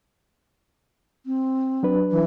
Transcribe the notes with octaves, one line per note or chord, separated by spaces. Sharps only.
C4
F#3 D4 B4
E3